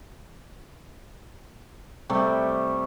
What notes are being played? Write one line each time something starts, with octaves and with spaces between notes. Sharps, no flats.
C3 G3 A3